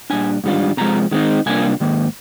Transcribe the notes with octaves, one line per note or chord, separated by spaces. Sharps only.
A#2 G3 D4 G#5
G#2 D#3 G3 D4 F4
C3 F3 G#3 A#5
D#3 G#3 C4 D#4
C3 G3 A#3 D4 F4 G#5
G#2 D#3 A#3